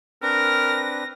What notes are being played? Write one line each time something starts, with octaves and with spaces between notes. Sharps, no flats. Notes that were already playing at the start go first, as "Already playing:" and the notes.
C4 D4 A#4 B4 A#6